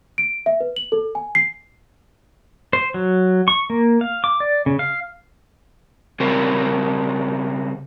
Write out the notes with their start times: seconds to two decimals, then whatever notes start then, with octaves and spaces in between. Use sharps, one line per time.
0.18 D7
0.46 E5
0.60 B4
0.76 F#7
0.92 A4
1.15 G#5
1.35 C7
2.73 C5
2.94 F#3
3.48 C#6
3.70 A#3
4.01 F5
4.24 D6
4.40 D5
4.66 C#3
4.79 F5
6.20 C#3 G3 C4 A#4